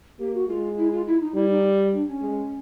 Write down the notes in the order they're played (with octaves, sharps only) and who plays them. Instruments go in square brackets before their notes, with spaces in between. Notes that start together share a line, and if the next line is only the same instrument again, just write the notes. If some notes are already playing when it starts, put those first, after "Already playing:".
[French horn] A#3 [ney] G4
[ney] F#4
[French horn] G#3 [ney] F4
[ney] E4
F4
E4
D#4
[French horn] G3 [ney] E4
[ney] D#4
D4
C#4
[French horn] G#3